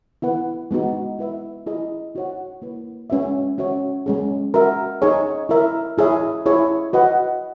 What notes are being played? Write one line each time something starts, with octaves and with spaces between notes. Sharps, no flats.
B3 E4 B4 F#5
G#3 B3 D#4 F#4
E4 B4 E5
E4 G#4 D#5
D#4 F#4 C#5 F#5
A#3 E4 B4
G#3 C#4 F#4 B4 E5
C#4 F#4 C#5 E5
G#3 C#4 G#4
F#4 A#4 E5
D#4 G#4 C#5
E4 A#4 E5
E4 G#4 C#5 E5
E4 G#4 C#5 E5
F#4 B4 D#5 F#5